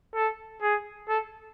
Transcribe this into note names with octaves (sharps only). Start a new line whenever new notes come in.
A4
G#4
A4